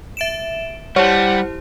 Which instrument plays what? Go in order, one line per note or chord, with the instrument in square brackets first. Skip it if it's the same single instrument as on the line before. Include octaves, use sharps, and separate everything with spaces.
[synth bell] E5 D7 E7
[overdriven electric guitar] G3 [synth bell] E4 G4 C5 [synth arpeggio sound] C#5 [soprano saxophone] F#5